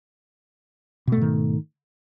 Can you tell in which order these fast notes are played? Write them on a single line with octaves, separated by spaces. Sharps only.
B2 A3 G#2 D#3